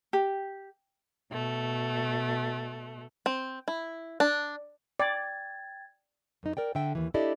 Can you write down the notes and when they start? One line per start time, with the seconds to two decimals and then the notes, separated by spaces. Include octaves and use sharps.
0.13 G4
1.31 B2 A3
3.26 C4
3.68 E4
4.20 D4
5.00 D5 G5 G#6 A6
6.43 F#2 D#4
6.57 A#4 D5 G5
6.75 D3 A4 E5 G5
6.95 D#2 E3
7.14 D4 E4 G4 A4 D5 D#5